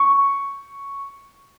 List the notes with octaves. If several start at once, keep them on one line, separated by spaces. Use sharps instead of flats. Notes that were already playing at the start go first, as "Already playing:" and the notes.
Already playing: C#6